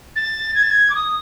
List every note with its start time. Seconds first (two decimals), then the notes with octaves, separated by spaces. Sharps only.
0.16 A6
0.55 G#6
0.63 A6
0.71 G#6
0.90 D6
0.95 D#6